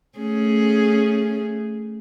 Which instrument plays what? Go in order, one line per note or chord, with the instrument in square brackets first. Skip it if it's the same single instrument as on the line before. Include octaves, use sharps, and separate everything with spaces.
[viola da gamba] A3 C#4 G#4